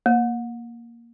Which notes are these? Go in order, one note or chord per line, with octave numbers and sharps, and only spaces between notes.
A#3